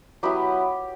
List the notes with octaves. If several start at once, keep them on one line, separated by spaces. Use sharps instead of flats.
F#3 B3 E4 G4